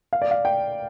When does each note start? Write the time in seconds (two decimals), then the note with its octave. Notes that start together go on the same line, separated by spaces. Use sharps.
0.13 F5
0.22 D5
0.31 F5
0.45 G5